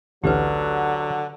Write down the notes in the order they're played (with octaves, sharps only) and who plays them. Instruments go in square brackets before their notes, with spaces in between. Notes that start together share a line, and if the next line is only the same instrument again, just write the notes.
[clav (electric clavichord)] A1 D2 A2 [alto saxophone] D3 [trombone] F#3 [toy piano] G4 B4